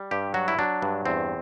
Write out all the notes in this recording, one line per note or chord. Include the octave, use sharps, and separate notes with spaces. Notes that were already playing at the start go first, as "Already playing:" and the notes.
Already playing: G3
G2 G4
F#3 F#4
E4
F#3 D4
G2
E2 C4